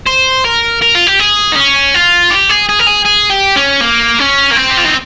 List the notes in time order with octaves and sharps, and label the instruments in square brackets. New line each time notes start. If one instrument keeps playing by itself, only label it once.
[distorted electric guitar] C5
A#4
A#4
F4
G4
G#4
D#4
C#4
F4
G4
G#4
G#4
A#4
G#4
G#4
G4
C#4
A#3
C#4
A#3
C4
G4
F4
D#4